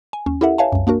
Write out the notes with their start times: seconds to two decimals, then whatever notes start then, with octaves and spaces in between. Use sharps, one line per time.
0.13 G#5
0.26 D#2 C#4
0.41 E4 G4 A4 A#4 E5 F#5
0.58 B4 C#5 E5 F5 G#5 A5
0.72 C2 F#2
0.87 A#3 D4 F#4 A#4